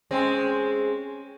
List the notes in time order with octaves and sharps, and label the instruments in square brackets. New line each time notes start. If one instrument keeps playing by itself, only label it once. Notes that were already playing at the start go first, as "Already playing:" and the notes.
[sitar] G#3 C4 [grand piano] C#4 G#5 C6